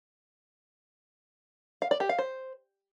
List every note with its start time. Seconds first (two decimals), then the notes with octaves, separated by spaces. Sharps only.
1.82 F5
1.91 D5
2.00 G4
2.09 F5
2.19 C5